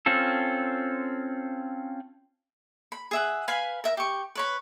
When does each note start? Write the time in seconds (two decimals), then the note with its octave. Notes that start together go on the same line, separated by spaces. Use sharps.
0.06 C4 C#4 F4 A4
2.92 B5
3.11 G#4 E5 F#5
3.48 B4 F5 G#5 B5
3.84 A#4 E5
3.97 G4 C#6
4.35 B4 C#5 B5